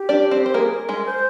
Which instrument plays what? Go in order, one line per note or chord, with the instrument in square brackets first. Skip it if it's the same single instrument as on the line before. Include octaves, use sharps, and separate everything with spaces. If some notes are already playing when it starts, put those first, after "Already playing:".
Already playing: [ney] G4
[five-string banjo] D4 D5
C4 C5
C5
[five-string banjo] A#3 A#4 [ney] G#4
[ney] A#4
[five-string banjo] G#3 G#4 [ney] A#4
[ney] C5